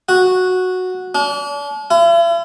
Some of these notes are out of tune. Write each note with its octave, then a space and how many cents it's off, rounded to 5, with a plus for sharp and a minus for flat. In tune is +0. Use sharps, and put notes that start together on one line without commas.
F#4 -10
D4 -40
E4 +45